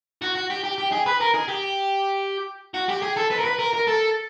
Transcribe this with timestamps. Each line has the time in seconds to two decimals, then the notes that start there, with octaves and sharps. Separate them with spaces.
0.22 F#4
0.35 F#4
0.50 G4
0.64 G4
0.78 G4
0.92 G#4
1.06 B4
1.20 A#4
1.34 G#4
1.48 G4
2.74 F#4
2.88 G4
3.02 G#4
3.16 A4
3.30 B4
3.39 A#4
3.44 B4
3.59 A#4
3.73 A#4
3.87 A4